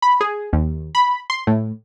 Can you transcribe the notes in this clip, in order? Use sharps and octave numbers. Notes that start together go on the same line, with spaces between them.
B5
G#4
D#2
B5
C6
A2